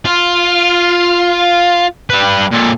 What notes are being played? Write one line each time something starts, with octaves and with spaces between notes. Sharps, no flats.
F4
G3 B4
A#2 A4